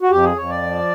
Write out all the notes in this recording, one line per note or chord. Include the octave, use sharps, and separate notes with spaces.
F#4
F2 G4
G#4
F2 C#5
D5
F3